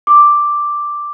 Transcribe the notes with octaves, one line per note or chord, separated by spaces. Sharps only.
D6